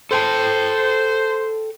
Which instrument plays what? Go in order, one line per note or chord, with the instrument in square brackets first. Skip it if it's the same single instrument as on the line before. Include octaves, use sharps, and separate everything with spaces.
[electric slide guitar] A4 G5 A5 [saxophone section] C5